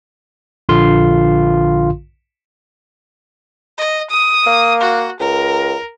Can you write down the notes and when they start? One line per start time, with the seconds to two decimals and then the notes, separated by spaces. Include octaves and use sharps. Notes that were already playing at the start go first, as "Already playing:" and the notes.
0.69 A#1 D3 F4 F5 C6
3.78 D#5
4.10 D#6
4.46 A#3
4.81 F#4
5.20 C#2 A#4